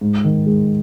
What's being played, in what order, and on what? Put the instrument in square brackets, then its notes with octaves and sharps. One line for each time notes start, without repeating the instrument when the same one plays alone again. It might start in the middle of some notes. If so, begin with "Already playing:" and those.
[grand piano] G#2
D#3
G#3